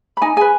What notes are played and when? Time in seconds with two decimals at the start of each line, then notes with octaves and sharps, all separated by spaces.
0.17 B5
0.22 D#4 G#5
0.36 G#4 B4 G#5